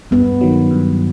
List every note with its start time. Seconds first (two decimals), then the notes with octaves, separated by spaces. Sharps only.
0.11 G2 B3
0.41 D#3 F#3
0.71 G2